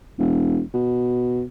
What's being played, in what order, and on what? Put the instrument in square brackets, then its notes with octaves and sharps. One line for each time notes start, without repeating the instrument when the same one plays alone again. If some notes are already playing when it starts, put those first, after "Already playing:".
[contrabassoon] E1
B2